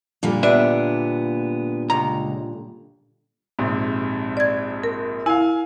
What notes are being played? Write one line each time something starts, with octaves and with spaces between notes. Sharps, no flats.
A#2 D3 G3
B3 D4 E5
C#2 A#5
A#1 G#2 C3
D5 G#6
A#4
E4 F5 G#5